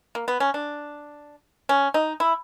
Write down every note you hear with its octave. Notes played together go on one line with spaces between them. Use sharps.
A#3
B3
C#4
D4
C#4
D#4
E4